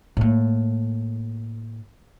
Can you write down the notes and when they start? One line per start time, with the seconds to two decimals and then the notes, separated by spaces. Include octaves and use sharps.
0.17 A2 A#3